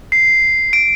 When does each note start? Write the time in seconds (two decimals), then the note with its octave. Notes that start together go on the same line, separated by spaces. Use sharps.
0.12 C7
0.73 D7